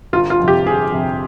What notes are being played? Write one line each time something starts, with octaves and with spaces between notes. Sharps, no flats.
G1 F4
F4
F2 C3
G4
G1 G#4
F2 C3